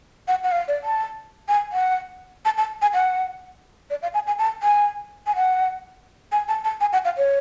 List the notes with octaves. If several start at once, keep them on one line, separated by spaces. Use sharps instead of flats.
F#5
F#5
F5
D5
A5
G#5
F#5
A5
A5
G#5
F#5
D5
F5
G#5
G#5
A5
G#5
G#5
F#5
G#5
A5
A5
G#5
F#5
F5
C#5